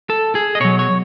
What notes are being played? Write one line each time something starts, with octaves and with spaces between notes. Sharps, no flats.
A4
G#4
D#5
B2 F#3 C#5
C#5